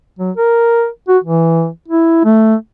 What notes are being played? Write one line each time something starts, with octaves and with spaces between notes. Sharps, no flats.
F#3
A#4
F#4
E3
E4
A3